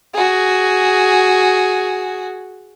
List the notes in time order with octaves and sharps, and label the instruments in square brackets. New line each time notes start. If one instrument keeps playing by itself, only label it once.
[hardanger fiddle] F#4 G#4